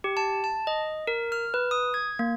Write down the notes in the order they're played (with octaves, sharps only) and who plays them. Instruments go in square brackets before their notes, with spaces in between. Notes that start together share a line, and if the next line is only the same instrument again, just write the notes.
[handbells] G4
A5
A5
D#5
A#4
F6
B4
D#6
G#6
A#3